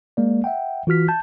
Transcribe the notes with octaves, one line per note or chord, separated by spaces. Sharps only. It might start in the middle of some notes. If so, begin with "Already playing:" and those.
G#3 A#3 D5
E5 F#5 G5
E3 F4 F#4 F6 B6
A5 G6